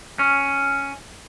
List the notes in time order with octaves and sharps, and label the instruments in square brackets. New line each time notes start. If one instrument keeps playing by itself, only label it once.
[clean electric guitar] C#4